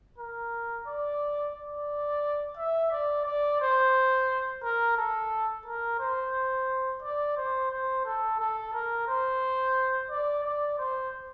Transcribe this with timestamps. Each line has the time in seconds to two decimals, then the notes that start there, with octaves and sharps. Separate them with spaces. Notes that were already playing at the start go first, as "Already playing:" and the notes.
0.18 A#4
0.86 D5
1.55 D5
2.57 E5
2.91 D5
3.26 D5
3.60 C5
4.63 A#4
4.97 A4
5.65 A#4
5.99 C5
7.02 D5
7.37 C5
7.71 C5
8.05 A4
8.39 A4
8.73 A#4
9.08 C5
10.10 D5
10.44 D5
10.78 C5